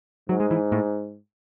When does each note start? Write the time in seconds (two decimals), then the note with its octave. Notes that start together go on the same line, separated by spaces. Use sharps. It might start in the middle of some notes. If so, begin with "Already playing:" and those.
0.29 G#2 F#3
0.40 G#3
0.51 E3
0.72 A2